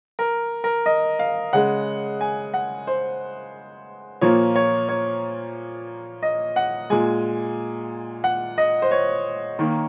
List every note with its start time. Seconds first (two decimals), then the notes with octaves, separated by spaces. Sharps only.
0.19 A#4
0.64 A#4
0.86 D#5
1.19 F5
1.53 C#3 G#3 F#5
2.21 G#5
2.54 F#5
2.87 C5
4.21 A#2 F3 A#3 C#5
4.56 C#5
4.89 C#5
6.23 D#5
6.56 F#5
6.90 A#2 G#3 G#5
8.24 F#5
8.58 D#5
8.82 C5
8.91 C#5
9.59 D#3 A#3